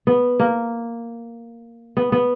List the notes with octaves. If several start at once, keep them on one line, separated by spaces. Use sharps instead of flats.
B3
A#3
B3
B3